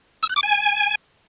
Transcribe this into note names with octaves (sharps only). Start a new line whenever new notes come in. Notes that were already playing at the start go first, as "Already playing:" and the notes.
E6
F#6
D6
G#5